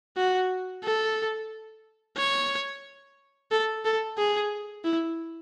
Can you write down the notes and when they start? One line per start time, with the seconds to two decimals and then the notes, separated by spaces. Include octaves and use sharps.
0.17 F#4
0.84 A4
2.17 C#5
3.51 A4
3.85 A4
4.18 G#4
4.85 E4